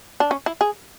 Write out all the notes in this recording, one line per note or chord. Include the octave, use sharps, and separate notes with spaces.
D4
C#4
E4
G#4